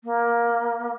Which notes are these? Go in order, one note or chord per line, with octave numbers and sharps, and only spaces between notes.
A#3